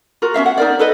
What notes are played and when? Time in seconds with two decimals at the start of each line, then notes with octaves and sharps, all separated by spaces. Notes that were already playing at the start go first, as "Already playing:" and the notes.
0.22 F4 F#4 A#4
0.34 C#4 D#4 E5 F5
0.46 F#5
0.58 D#4 A#4 D5
0.79 A4 B4 D#5